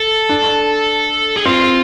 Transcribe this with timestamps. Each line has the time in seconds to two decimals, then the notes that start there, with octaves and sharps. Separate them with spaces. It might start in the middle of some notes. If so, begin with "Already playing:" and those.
Already playing: A4
0.29 D4
1.37 G#4
1.45 C4 F4